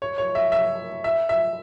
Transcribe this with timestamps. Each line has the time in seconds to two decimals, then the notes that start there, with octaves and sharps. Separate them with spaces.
0.02 C#5
0.18 C#5
0.35 E5
0.52 E5
1.04 E5
1.29 E5